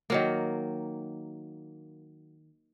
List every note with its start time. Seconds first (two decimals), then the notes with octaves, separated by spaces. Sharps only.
0.10 D#3 F#3 A#3